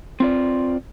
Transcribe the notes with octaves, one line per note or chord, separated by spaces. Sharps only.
C4 F4 D5